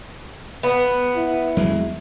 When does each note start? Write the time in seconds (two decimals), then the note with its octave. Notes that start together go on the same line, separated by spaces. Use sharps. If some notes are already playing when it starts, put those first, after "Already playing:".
0.63 B3
1.15 E4
1.57 E2 F#3 G#3